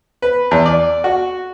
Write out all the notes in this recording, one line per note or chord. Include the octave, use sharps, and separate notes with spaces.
B4
E2
D5
F#4